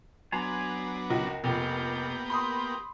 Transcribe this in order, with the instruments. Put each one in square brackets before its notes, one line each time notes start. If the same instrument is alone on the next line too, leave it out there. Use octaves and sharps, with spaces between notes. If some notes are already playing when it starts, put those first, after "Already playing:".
[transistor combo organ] F#3 B3 D4 [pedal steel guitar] G#5 A#5 C6
[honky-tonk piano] C#2 F#4 [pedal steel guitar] A#4
[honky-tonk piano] F1 [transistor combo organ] A#3 B3 G4
[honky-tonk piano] B5 C6 D#6